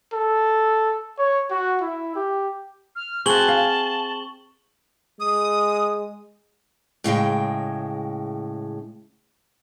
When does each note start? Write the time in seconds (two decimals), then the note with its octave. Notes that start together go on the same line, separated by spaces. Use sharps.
0.13 A4
1.19 C#5
1.51 F#4
1.82 E4
2.16 G4
2.95 F6
3.26 C4 F#4 G#4 A5 C#6 F#7 G7
3.48 F5
5.20 G#3 D#6
7.04 A2 C#3 G#3 G5